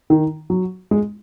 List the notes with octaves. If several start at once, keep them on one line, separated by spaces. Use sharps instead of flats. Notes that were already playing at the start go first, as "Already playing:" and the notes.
D#3
F#3
G#3